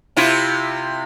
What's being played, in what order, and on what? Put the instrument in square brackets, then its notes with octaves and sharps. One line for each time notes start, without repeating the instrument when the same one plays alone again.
[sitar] C3 E4 F4